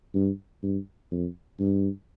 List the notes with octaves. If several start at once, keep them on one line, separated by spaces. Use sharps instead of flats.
G2
G2
F2
G2